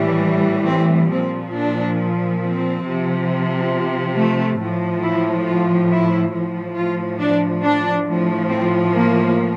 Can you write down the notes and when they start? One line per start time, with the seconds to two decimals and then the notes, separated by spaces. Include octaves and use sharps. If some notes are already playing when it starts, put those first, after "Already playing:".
Already playing: A2 E3 G3
0.68 C4
1.12 A#2 F3 C4
1.55 D4
2.41 C4
2.85 C3 F3
4.16 A3
4.59 A2 F3
5.02 E4
5.45 F4
5.90 E4
6.32 A2 F3
6.76 F4
7.19 D4
7.63 D4
8.07 A2 F3
8.50 C4
8.94 A#3